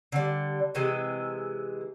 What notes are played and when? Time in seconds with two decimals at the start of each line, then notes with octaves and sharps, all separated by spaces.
0.12 D3 G3
0.75 C3 E3 G#3